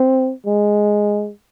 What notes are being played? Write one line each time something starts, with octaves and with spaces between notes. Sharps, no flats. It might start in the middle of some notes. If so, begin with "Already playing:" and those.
Already playing: C4
G#3